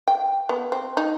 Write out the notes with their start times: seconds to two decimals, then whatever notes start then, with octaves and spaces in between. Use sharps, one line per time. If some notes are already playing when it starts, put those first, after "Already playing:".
0.08 G5
0.49 B3
0.72 C4
0.97 D#4